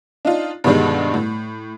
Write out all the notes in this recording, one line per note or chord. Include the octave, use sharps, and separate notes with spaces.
D4 D#4 F4
G2 B2 D3 D#3 G3 G#3
A2